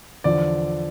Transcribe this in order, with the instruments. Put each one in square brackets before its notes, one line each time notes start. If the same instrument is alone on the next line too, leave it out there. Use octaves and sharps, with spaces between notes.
[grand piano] E2 D3 F3 D5